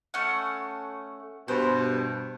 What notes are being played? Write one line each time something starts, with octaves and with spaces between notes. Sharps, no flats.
A3 C#4 F#5
G2 B2 C5